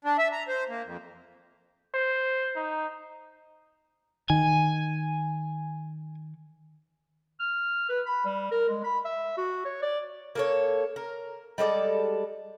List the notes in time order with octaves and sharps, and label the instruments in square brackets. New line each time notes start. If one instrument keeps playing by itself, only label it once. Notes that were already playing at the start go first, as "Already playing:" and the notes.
[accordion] D4
E5
A#5
C5
A#3
F2
[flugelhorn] C5
D#4
[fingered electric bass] D#3 [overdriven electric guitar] G#5
[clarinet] F6
B4
B5
G3
A#4
G#3
B5
E5
F#4
C#5
D5
[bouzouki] A#3 A4 C#5
A#4
G3 G#3 A4 D5